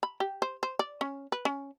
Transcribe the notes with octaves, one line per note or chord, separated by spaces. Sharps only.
B5
G4
C5
C5
D5
C#4
B4
C#4